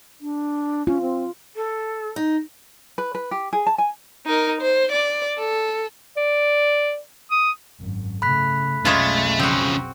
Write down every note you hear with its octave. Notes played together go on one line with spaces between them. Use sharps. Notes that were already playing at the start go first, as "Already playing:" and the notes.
D4
C#4 F4
C4
A4
D#4
B4
B4
G4
G#4
A5
G#5
D#4 A#4
C5
D5
A4
D5
D#6
G#1 F#2
C#3 A3 B5 F#6 B6
B1 F2 G#3 A3 C#4 F4
C#3 F3 C4 F#4